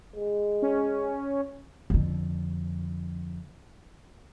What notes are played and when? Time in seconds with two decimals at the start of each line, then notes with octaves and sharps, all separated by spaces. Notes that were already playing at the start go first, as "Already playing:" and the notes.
0.16 G#3
0.62 C#4
1.90 F2 D3